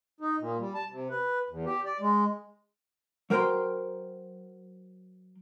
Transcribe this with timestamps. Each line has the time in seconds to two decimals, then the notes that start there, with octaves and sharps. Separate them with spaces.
0.20 D#4
0.40 A#2
0.59 G3
0.75 A5
0.91 C3
1.10 B4
1.49 E2
1.67 G4
1.86 D5
2.00 G#3
3.30 F#3 A#4 C5 G5 A#5 C6